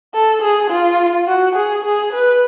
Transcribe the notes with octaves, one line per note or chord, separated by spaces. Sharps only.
A4
G#4
F4
F#4
G#4
G#4
B4